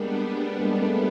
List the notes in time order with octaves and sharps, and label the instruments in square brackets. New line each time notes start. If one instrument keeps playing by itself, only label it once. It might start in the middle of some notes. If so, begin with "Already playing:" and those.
Already playing: [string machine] G3 B3 D4 [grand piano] G#3 A#3
[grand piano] G#3 A#3
A3 B3